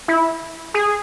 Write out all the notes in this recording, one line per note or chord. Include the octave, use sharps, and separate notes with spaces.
E4
G#4